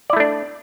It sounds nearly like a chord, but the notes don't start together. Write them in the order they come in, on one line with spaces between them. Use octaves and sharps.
D5 E4 A3 D4